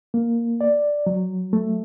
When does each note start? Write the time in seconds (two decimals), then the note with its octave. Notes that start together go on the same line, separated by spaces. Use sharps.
0.14 A#3
0.61 D5
1.07 F#3
1.53 A3